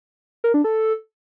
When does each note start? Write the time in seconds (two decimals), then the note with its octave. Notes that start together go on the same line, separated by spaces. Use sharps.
0.44 A#4
0.54 D4
0.64 A4